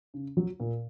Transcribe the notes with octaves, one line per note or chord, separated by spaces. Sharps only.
C#3
F#3
A#2